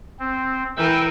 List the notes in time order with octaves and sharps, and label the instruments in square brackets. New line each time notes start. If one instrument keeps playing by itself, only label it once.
[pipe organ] C4
[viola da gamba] E3 A#4 B4 [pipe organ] G5 E6